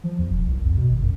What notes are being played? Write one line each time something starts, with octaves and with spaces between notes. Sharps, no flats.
F3
E2
E1
C2
F2
B2
G#1
F#2